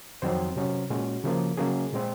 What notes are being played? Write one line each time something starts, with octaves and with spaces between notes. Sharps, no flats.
F2 D#3 F#3 C4 C5
C3 F#3 C#4
A#2 G#3 C#4 F#4
C#3 F3 A#3
C#3 F#3 A#3 C#4 G#4
A#2 G#3 C4